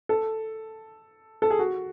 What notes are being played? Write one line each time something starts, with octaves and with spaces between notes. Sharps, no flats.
A4
A4
G#4
F#4